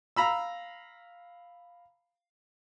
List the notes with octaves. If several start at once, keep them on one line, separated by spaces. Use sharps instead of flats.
F5 A#5 B5 E6